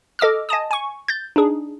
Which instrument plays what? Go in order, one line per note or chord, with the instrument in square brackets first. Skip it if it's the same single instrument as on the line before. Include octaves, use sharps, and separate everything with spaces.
[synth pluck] A4 D#5 D6 E6 F6
D#5 G#5 A5 D#6
G#5 C#6
G6 A6
D4 D#4 G#4